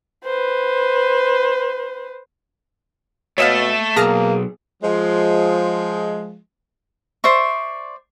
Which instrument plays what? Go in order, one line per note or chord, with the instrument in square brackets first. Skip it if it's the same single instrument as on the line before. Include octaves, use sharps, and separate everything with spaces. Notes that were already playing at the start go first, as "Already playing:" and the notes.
[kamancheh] B4 C5
[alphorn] B2 [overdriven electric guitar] A3 A4 [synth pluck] C#5 D#5 F5
[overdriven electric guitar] B1 [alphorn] A#3 [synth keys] G#4 [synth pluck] A5 A#5 F6
[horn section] F3 G#3
[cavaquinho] C5 D5 E5 C#6